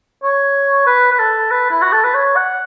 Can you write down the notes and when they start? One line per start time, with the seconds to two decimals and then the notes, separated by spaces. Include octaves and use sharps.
0.23 C#5
0.87 B4
1.12 B4
1.19 A4
1.51 B4
1.71 E4
1.82 F#4
1.93 A4
2.04 B4
2.15 C#5
2.36 F#5